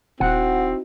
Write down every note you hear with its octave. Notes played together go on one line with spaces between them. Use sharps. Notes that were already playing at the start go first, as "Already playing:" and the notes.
D#1 C4 D#4 E4 F#4 F#5